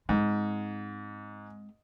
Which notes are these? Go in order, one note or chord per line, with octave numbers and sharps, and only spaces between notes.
G#2 G#3 C4